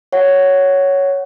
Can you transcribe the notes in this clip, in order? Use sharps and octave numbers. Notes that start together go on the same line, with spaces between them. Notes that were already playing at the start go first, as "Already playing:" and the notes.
C#5 F#5